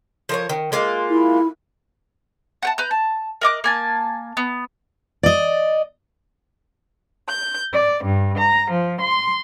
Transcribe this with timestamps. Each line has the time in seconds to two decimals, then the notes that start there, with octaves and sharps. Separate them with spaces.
0.29 F3 A#4 C#5
0.49 D#3
0.72 G#3 A#3 F4
1.10 E4
2.63 F#5 G5 A5
2.78 B4 A#5 G6
2.91 A5
3.42 A#4 D#5 D6 F#6
3.64 A#3 G#5 A5
4.37 B3
5.23 D5 D#5
7.28 G6
7.73 D5
8.05 G2
8.37 A#5
8.72 F3
9.00 C6